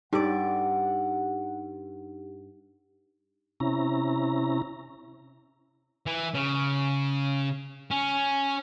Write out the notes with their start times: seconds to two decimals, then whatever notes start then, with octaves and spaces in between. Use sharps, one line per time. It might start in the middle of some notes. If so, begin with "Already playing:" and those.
0.13 G2 D#4 G4 D5 F#5
3.60 C3 C#4 E4 A#5
6.06 E3
6.34 C#3
7.91 C#4